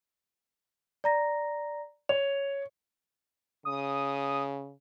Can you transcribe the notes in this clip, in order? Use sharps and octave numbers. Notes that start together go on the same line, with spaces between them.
D5 A#5 A#6
C#5 F7
C#3 D#6